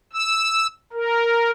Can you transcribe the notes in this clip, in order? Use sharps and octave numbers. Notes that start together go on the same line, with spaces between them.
E6
A#4